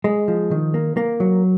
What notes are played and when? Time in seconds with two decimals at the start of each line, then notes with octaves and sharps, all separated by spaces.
0.04 G#3
0.28 F3
0.51 D#3
0.74 A#3
0.97 A#3
1.20 F#3